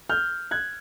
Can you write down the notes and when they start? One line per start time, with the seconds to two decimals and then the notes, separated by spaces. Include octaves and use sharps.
0.10 F6 G6
0.51 F#6 G#6